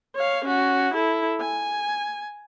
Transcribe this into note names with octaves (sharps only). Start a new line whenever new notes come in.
C#5 F5
C#4 F#4
E4 A4
G#5